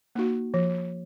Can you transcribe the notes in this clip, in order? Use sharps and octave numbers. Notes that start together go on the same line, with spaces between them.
A#3 D#4 F#4
F3